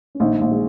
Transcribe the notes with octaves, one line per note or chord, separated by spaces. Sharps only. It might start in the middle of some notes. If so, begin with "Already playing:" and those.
C#4
A#1 D#3 D#4
A#1
G#3 G#4